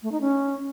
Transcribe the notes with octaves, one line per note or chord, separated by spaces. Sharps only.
A3
D#4
C#4